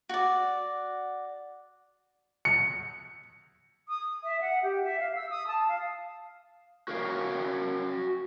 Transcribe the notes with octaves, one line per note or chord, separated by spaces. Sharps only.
F#4 D5
C#7
D#6
E5
F#5
G4
E5
F5
E6
D#6
A5
F5
F#4 A#4 C#5 F5